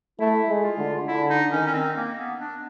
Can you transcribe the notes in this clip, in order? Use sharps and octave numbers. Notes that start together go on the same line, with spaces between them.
A3 E4
G#3
F4
D3
D3 E4
D#4
D#3 C#4
C#4
C4
A#3
B3
D4